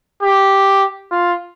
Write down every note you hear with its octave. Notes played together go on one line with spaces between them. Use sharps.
G4
F4